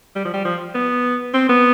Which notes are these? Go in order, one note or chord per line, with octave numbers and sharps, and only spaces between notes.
G3
F3
G3
F3
B3
C4
B3